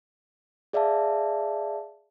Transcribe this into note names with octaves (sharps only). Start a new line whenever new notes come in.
G#4 D5 E5 F5 A5